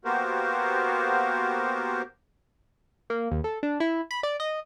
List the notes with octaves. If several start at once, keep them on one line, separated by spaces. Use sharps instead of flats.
A#3 B3 F#4 G4 A#4 C5
A#3
D#2
A4
D4
E4
B5
D5
D#5